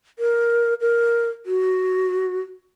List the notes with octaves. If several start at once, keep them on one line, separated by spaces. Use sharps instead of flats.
A#4
A#4
F#4